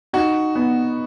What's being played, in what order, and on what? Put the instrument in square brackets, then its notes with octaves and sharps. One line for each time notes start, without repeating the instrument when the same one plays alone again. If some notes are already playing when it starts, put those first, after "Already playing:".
[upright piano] D#4 [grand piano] F#4
[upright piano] B3